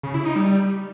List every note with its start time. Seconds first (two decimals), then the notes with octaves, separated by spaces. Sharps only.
0.03 C#3
0.14 E4
0.25 D#4
0.36 G3